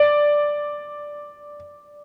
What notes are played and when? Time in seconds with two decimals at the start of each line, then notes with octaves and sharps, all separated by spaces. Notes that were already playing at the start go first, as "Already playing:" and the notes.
Already playing: D5